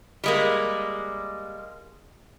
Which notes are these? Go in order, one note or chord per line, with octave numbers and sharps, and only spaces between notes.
G3 G#3 A#3